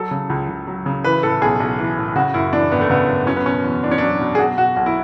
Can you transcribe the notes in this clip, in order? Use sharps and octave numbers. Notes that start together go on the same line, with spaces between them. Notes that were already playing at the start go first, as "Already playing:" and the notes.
Already playing: F#3 A4
C#3
C#2
C#2
F#3
C#3
E3 B4
A2 A4
B1 G#4
B1
E3
A2
C#3 F#4
F#2 E4
E3 D4
G#1 B3
A3
C#3 B3
F#2
F#3 C#4
B3
B2 C#4
E2
E2 D4
C#4
F#3 D4
B2
G#4
F#3 F#4
B2 F#4
B1 F#4
E4